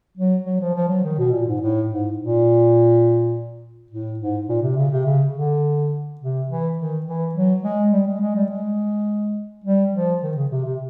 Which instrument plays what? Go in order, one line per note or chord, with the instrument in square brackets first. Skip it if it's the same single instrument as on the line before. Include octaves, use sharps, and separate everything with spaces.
[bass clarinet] F#3
F#3
F3
F3
F#3
D#3
B2
A#2
G#2
A2
G#2
A#2
A2
G#2
A#2
C3
C#3
C3
C#3
D3
C3
E3
D#3
E3
F#3
G#3
G3
G#3
G#3
G3
G#3
G3
F3
D#3
C#3
C3
C3